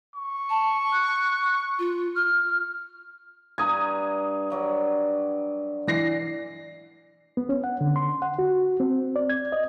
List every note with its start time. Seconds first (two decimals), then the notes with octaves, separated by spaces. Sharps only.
0.15 C#6
0.50 A5
0.92 F#6
1.79 F4
2.15 F6
3.58 G2 A#5 D#6 G#6
4.50 G2 F#3 D5
5.87 E3 D5 A#6 C7
7.37 B3
7.49 C#4
7.64 F#5
7.81 D3
7.96 C6
8.22 F#5
8.39 F#4
8.80 C4
9.16 D5
9.30 G#6
9.52 D#5